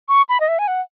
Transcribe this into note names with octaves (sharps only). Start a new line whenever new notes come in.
C#6
B5
D#5
E5
G#5
F#5